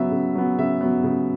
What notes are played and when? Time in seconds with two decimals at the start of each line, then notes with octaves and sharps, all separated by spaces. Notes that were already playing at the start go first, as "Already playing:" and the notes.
Already playing: C#3 F#3 B3 E5
0.12 C#3
0.35 F#3 B3
0.58 C#3 E5
0.81 F#3 B3
1.04 C#3